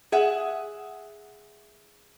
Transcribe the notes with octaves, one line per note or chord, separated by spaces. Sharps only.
G#4 E5 F#5